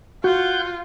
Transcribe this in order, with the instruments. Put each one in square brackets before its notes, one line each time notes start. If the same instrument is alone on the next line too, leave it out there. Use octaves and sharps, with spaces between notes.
[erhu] F4 [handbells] F#4 [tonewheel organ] F#5 G6